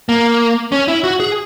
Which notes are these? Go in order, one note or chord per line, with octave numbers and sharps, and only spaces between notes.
A#3
C#4
E4
F#4
G#4